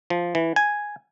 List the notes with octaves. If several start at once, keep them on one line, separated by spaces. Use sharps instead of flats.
F3
E3
G#5